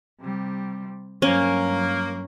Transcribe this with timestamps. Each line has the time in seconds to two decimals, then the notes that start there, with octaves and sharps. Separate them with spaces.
0.21 C3 G3
1.22 G2 F#3 A#3 C#4